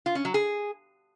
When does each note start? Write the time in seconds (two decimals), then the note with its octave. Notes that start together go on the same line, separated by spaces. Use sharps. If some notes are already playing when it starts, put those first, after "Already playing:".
0.06 F4
0.15 C#4
0.25 F#3
0.34 G#4